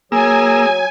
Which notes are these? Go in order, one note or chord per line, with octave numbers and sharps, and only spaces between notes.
F#3 A#3 G#4 G#5 E6